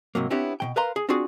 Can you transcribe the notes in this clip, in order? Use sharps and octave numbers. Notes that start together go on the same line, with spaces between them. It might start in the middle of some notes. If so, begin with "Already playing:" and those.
G#2 C3 F#3 A#3
B3 C4 D4 E4 G4 C#5
B2 D#3 G5
A#4 B4 F5 A#5 C6
G#4
C4 D4 F4 F#4 G#4 D5